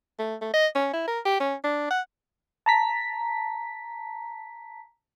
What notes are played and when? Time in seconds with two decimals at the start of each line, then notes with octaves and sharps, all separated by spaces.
0.19 A3
0.41 A3
0.54 D#5
0.75 C#4
0.93 E4
1.08 A#4
1.25 G4
1.40 C#4
1.64 D4
1.90 F#5
2.66 A5 A#5 B6